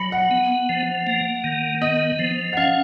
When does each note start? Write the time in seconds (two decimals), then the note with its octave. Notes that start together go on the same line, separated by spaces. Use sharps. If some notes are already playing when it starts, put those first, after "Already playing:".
Already playing: F#3 B5
0.12 F#5
0.31 B3
0.69 F3
1.07 A#3
1.44 D#3
1.82 B3 D#5
2.19 F3
2.53 F#5
2.57 C#4 F5